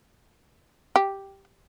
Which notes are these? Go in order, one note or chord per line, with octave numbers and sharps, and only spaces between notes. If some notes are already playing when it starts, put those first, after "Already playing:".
G4